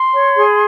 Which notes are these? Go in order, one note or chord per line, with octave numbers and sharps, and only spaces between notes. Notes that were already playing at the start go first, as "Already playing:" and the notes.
Already playing: C6
C#5
G#4